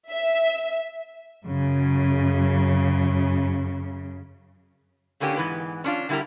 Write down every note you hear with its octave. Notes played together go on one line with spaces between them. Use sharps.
E5
F#2 C#3
A2 D3 A#3 C#4 G4
G#2 E3 B3 B4
C#4 D4 F4
D3 G3 E4 G4 A#4 A#5